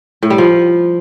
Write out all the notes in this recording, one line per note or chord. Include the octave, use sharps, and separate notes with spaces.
A2
G3
F3